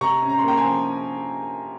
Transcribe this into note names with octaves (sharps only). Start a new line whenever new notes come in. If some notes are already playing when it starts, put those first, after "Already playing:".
C3 A#5 C#6
C#4
A#5
C6
A#3 G5 A#5
G#5 C6
F3